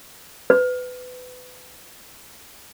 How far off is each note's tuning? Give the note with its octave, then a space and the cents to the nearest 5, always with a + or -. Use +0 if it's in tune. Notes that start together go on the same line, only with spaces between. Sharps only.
B4 +25